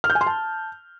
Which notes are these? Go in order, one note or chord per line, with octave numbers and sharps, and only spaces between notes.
F6
G6
G#5
C6
A5